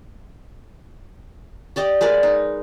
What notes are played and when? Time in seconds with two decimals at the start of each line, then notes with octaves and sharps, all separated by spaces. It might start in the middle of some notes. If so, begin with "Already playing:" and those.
1.76 G4 D5 D#5 G5
2.01 G#3 A#4 B4 D5
2.23 D#4